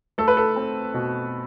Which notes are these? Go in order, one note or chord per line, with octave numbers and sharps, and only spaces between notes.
A3 A4
B4
A4
C4
B2